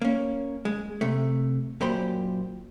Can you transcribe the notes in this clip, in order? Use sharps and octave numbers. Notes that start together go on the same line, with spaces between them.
A#3 C#4
G#3
C3 A3
F#2 A#2 G4 C5 B5